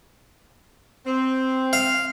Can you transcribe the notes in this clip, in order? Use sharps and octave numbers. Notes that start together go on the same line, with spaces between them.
C4
F5